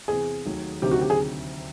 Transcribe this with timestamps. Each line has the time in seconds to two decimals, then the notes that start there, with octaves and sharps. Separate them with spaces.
0.08 E2 C3 E3 G#4
0.45 D#2 D#3 F#3 A3
0.82 D2 C3 D#3 F#3 G4
0.91 F#4
1.01 G4
1.10 G#4